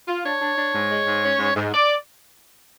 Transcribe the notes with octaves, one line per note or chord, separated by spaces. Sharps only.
F4
D4 C#5
D4
D4
G#2
G#3
G#2
C#4
G#2
G#2
D5